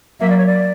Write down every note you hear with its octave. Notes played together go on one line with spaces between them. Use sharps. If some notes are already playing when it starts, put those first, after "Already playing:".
F#3 A#3 E5
D5
C#5
D5